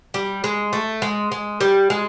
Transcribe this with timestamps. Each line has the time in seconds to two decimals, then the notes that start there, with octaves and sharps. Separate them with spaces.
0.14 G3
0.44 G#3
0.73 A3
1.02 G#3
1.32 G#3
1.60 G3
1.90 G#3